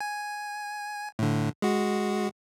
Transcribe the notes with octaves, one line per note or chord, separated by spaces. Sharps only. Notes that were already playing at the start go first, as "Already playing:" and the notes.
G#5
A2 D3
G#3 F#4